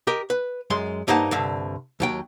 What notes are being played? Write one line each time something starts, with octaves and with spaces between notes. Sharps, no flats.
G4 A#4 D#5
B4
F#2 G#3 C6
G2 A#3 D#4 C5 F#5 A5
C2 G2 D3
D#2 F#3 G5